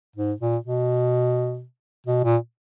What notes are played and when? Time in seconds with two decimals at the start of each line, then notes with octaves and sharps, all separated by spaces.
0.16 G#2
0.40 A#2
0.64 B2
2.06 B2
2.24 A#2